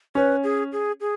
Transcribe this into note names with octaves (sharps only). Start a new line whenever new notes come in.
C#4 B4
G#4
G#4
G#4